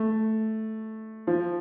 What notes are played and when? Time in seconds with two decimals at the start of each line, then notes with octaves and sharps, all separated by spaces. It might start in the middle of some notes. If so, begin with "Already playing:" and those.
Already playing: A3
1.27 F3